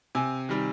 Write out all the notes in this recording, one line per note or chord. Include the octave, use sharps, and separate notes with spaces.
C3 G#5
D#3 G3